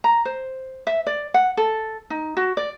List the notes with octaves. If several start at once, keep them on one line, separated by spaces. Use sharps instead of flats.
A#5
C5
E5
D5
F#5
A4
D#4
F#4
D5